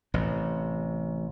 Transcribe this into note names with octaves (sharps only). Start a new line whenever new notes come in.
A1 C3